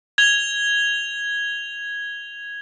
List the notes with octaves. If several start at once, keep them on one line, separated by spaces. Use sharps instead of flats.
G#6 F7 G7